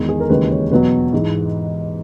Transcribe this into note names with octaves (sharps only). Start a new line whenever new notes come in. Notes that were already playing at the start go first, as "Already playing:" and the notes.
Already playing: E2 D#3 G#3
G#4
A#4
D#2 C#3 E3 G#3 B4
C#5
E2 B2 F#3 B4
G#2 E3 G#3